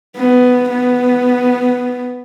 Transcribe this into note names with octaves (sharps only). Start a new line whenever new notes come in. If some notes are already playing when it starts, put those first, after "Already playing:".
B3
B3